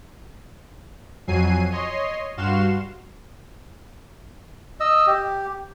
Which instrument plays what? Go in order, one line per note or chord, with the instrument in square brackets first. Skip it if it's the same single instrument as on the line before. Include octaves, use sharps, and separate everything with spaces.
[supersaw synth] F2 F#3 G#5 C7 D#7
C#5 D#5 C6
G2 F#4 F5 C6 E7
[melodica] D#5 E6
G4